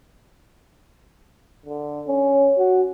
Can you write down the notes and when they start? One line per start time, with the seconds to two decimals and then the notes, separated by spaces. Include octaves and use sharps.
1.66 D3
2.08 C#4
2.58 F#4